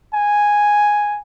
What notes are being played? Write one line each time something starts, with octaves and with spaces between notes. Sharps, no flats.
G#5